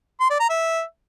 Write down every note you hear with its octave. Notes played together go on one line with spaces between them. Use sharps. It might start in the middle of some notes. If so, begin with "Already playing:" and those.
C6
D5
A#5
E5